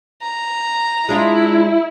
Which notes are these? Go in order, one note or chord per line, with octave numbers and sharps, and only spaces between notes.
A#5
G#3 D4 E4 F4